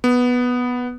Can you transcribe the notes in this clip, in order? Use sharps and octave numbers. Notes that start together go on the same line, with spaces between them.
B3